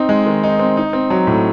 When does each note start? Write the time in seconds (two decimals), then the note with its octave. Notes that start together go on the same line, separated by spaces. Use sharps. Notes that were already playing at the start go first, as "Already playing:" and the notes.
Already playing: C4 D#4
0.09 G#3
0.26 D#3
0.44 D#4
0.59 C4
0.77 D#4
0.93 C4
1.10 F#3
1.27 A2